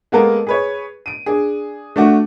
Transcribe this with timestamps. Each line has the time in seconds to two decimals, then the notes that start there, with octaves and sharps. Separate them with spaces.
0.12 G#3 A#3 B3 A4 A#4
0.47 G#4 B4 C#5
1.06 D7 D#7
1.26 D4 G#4
1.96 A3 D4 F#4